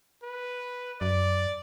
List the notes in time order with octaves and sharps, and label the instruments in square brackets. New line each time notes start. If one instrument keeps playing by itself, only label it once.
[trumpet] B4
[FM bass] F#2 [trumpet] D5